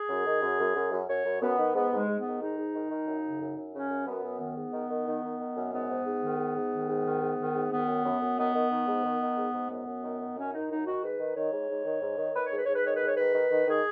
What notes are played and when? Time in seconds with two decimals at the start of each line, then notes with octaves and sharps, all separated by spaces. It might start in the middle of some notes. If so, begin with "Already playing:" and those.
Already playing: G#4
0.09 F#2
0.27 D#3
0.42 F#2
0.60 F#2
0.76 F#2
0.92 F#2
1.08 F#2 C#5
1.25 F#2
1.42 F#2 B3
1.59 D#3
1.75 G#2 B3
1.92 G#2
1.97 G#3
2.09 G#2
2.19 B3
2.25 D#3
2.41 G#2 D#4
2.59 G#2
2.75 D#3
2.92 D#3
3.07 F#2
3.24 C#3
3.41 F#2
3.57 F#2
3.75 C#3 C#4
3.90 F#2
4.07 F#2 B3
4.23 F#2
4.40 D#3 B3
4.57 G#2
4.73 D#3
4.90 D#3
5.07 D#3
5.24 D#3
5.39 D#3
5.57 F#2
5.72 G#2 B3
5.90 G#2
6.06 G#2
6.22 D#3
6.39 G#2
6.56 G#2
6.72 D#3
6.89 G#2
7.06 D#3
7.22 G#2
7.39 D#3
7.55 G#2
7.72 D#3 B3
7.88 F#2
8.05 F#2
8.21 F#2
8.38 D#3 B3
8.54 D#3
8.71 D#3
8.87 G#2
9.04 D#3
9.21 D#3
9.37 G#2
9.54 G#2
9.70 F#2 B3
9.88 F#2
10.03 D#3
10.19 D#3
10.36 F#2 C#4
10.53 D#3 D#4
10.69 F#2 D#4
10.86 D#3 F#4
11.02 G#2 B4
11.20 D#3
11.37 D#3 C#5
11.52 G#2
11.69 G#2
11.86 D#3
12.02 G#2
12.18 D#3
12.35 D#3 B4
12.46 C#5
12.52 G#2 B4
12.65 G#2 C#5
12.75 B4
12.85 D#3 C#5
12.95 B4
13.02 G#2 C#5
13.15 D#3 B4
13.34 D#3
13.51 D#3
13.67 D#3 G#4